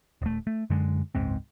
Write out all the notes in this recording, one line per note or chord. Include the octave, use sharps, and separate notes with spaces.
D#1 A3
A3
F#2 D3 G#3
F#1 C#2 G#2 C4